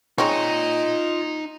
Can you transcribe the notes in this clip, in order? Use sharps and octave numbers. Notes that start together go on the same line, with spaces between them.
G#3 C4 C#4 D#4 F4 D#5 A#5